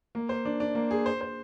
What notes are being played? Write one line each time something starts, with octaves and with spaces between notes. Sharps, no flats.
A#3
C5
D4
D4
A#3
G#4
C5
C5